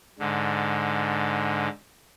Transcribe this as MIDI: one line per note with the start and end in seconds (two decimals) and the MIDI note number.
0.19 1.68 44
0.19 1.68 50